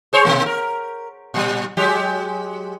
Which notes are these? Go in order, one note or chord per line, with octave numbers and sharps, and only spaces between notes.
G#4 C5 C#5
B2 E3 A#3
A#4
A#2 G3
F#3 G#3 G4